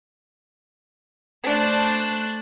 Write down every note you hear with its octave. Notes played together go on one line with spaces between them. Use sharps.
A3 D4 C5 F#6